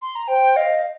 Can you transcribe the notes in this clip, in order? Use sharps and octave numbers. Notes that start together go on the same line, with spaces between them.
C6
A#5
C5 G5
D#5 F5